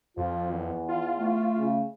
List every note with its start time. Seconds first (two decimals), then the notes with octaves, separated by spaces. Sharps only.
0.17 F2 F3 F4
0.51 E2 E3
0.88 F4
1.18 A3
1.58 C#3